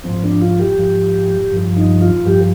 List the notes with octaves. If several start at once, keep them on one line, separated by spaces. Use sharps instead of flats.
G#2 F3 C4
D4
F4
G4
G#2 F3
G2 F3
D#4
F4
G2 F3 G4